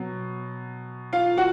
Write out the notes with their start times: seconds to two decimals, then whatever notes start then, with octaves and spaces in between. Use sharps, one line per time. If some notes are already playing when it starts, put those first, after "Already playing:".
Already playing: B2 F#3
1.13 F4 F5
1.37 F#4 F#5